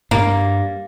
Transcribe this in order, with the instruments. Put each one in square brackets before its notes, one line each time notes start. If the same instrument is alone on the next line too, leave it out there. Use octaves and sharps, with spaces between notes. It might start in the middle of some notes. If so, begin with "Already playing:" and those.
[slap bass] G2 [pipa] A#3